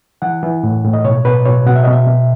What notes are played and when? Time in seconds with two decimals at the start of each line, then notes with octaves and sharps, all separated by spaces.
0.22 E3 F#5
0.43 E3
0.64 A2
0.84 A2
0.93 D#5
1.05 B2 C#5
1.25 B2 B4
1.46 B2 C#5
1.66 B2 F#5
1.76 E5
1.83 D#5
1.87 B2
1.93 E5
2.07 B2